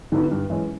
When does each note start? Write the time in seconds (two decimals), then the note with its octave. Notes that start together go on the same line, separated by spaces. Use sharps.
0.12 D3 F#3 B3 E4
0.31 G2
0.50 E3 G#3 C#4